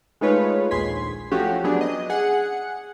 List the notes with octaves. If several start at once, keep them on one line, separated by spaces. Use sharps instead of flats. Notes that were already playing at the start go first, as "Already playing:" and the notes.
G#3 A3 D#4 F4 B4 C#5
A#1 D#2 G#4 C6 G#6 B6
F3 A3 C#4 F#4 G4
F#3 A3 B3 D4 G#4
D#5
G#4 F#5 C#7